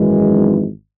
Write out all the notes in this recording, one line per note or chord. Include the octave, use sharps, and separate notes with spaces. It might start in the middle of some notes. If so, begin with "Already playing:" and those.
Already playing: G#1 F#2 E3 G#3